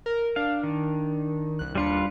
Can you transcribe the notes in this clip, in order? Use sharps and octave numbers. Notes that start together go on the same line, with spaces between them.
A#4
D4 F5
D#3
C2 F#6
D#2 G3 D4 F4 B4 C#7